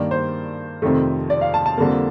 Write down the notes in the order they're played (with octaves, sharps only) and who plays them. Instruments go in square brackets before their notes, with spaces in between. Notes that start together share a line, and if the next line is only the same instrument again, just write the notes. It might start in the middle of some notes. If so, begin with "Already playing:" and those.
Already playing: [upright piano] G2 D#3 A#3 D5
C5
F2 C3 D#3 A3
D5
F5
A5
A5
F2 D3 G3 A#3